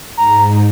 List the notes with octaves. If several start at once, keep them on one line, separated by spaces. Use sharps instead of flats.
G#2 A#5